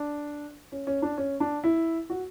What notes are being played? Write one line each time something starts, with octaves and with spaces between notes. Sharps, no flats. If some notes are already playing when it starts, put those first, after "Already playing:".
Already playing: D4
C#4
C#4
D4
C#4
D4
E4
F#4